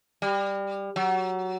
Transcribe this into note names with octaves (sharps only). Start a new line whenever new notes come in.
G3
F#3